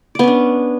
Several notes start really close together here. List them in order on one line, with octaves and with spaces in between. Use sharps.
D5 B3 C#4 D4